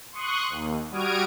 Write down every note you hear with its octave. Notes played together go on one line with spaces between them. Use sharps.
C6 C#6 D#6 F#6
D#2
G3 F#4 D#6 F6 G#6 D7